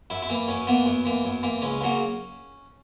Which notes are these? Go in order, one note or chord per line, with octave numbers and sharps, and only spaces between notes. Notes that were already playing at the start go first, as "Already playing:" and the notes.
F#2 E4
E4
E3 A#3
F#2 C#4
E3 A#3 B3
F#2
E3 A#3
F#2
E3 A#3
C#2 C#4
C#3 F#3 A#3